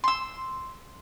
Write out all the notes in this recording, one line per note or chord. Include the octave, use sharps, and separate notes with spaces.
C6 E6